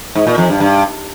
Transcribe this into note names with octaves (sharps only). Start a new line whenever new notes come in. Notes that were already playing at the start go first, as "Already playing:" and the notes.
G#2
A#2
F2
G2
G2